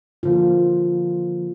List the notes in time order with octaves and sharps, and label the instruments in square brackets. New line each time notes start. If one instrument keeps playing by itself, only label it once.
[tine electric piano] D3 F3 A#3 [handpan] F4